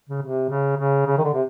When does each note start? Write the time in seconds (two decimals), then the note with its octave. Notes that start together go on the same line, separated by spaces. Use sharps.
0.09 C#3
0.22 C3
0.49 C#3
0.77 C#3
1.06 C#3
1.18 D#3
1.24 D3
1.34 C3